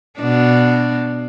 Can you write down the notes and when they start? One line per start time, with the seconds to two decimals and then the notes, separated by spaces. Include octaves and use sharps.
0.19 B2 D4